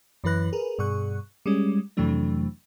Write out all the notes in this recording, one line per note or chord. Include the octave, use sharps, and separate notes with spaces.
F#2 E3 E4 B4 F#6 A#6
G#4 A#4 B4
G2 B2 G#4 C#6 F#6
G3 G#3 C#4
F2 C3 E3 F#3 A3 D4